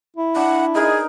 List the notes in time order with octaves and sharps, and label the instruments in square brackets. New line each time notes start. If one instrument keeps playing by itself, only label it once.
[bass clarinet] E4
[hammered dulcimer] D4 [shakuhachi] F#5
[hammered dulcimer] D#4 A#4 B4 [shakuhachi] G#4